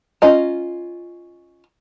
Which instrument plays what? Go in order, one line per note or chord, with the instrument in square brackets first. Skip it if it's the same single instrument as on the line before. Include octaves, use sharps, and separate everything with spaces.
[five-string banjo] C#4 F4 D#5 A#5